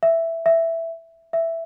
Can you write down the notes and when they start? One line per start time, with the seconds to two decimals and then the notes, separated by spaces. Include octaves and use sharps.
0.03 E5
0.46 E5
1.33 E5